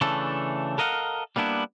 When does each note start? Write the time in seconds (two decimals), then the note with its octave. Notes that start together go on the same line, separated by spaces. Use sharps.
0.01 C#3 E3 A3 D4 A4
0.78 A4 A#4 D#5 F5 F#5
1.36 G3 A#3 B3 D4 E4